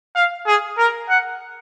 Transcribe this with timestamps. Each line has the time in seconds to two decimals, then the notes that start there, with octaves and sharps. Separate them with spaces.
0.15 F5
0.47 G#4
0.78 A#4
1.09 F#5